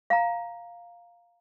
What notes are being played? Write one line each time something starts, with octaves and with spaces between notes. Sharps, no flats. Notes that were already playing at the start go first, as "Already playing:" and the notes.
F5 A#5